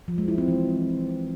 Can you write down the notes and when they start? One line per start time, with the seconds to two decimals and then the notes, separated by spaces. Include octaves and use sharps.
0.08 F3
0.18 G#3
0.28 E4
0.38 C4
0.48 E3